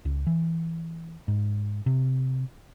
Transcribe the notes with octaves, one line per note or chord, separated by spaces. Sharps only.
C#2
E3
G#2
C3